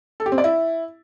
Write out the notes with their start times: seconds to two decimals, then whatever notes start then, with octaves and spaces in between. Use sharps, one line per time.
0.20 A4
0.26 G4
0.32 C4
0.38 D5
0.44 E4